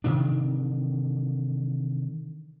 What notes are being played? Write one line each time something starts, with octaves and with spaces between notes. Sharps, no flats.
C3 D#3 E3 D4